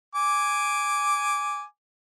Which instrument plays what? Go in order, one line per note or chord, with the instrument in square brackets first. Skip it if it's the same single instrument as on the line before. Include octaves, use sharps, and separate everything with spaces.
[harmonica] G#5 D6